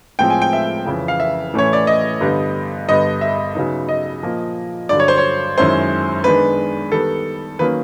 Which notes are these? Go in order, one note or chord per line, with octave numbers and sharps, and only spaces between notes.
A2 F3 G#3 C4 G5
G#5
G5
E5
F2 C#3 E3
F5
E5
A2 E3 A3 C#4 E4 C#5
D5
D#5
G2 D3 G3 B3
G2 D3 G3 B3 D#5
E5
C#3 F#3 B3 D#4
D#5
A#2 F3 A#3
G2 D3 F#3 D5
C#5
C5
C#5
F#2 D#3 G#3 C#4 E4 C5
D#3 G#3 B3 D4 B4
D#3 G3 B3 A4
D#3 F#3 A#3 C#4 B4